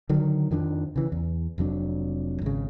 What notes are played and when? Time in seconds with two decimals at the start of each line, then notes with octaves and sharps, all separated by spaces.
0.09 D3 D#3 F#3
0.51 F2 D#3 F3 D4
0.96 C#3 E3
1.12 E2
1.58 F1 F2 F#3 D4
2.42 G#1 C#3